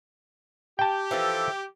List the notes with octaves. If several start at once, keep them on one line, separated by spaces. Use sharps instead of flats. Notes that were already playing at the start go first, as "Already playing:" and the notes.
G4 G5 A5
E3 F3 A4